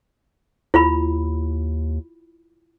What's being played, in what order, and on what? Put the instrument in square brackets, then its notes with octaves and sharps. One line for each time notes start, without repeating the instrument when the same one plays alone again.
[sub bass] D#2 [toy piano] E4 F4 B5